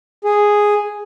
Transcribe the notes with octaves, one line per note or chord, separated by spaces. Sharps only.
G#4